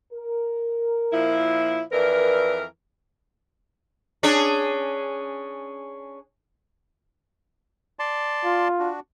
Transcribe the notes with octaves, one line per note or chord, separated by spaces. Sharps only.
A#4
A#2 F3 E4
F2 E3 A#4 B4 D5
C#4 D4 G#4
D5 A5 C6
F4
D4 F#4